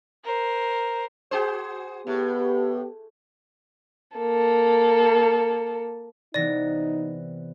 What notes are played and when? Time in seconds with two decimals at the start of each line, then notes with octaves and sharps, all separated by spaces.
0.24 A#4 C5
1.31 F#4 G#4 C5
2.07 A2 B3 G4
4.17 A#3 A4
6.34 C3 E3 B3 D#4 D5 A#6